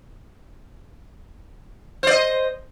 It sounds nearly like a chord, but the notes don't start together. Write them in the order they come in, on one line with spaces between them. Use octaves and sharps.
C5 D5 D#5